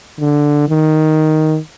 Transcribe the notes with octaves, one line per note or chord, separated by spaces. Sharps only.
D3
D#3